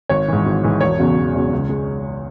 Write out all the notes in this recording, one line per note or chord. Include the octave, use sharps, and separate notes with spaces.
G#1 C#5
G#2 E3
G#1
G#2 E3
E1 C#5
E2 C#3 F#3
E1
E2 C#3 F#3
C#2
G#3